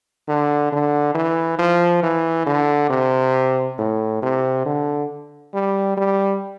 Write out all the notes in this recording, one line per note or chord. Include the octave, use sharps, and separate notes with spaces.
D3
D3
E3
F3
E3
D3
C3
A2
C3
D3
G3
G3